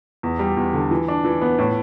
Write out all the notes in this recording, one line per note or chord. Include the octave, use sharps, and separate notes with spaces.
E2
G3
E2
D3
E3
D4
E3
B3
A2